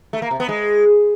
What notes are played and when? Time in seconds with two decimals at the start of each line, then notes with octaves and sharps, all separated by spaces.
0.13 A3
0.22 A#3
0.31 C3
0.40 B3
0.49 G#3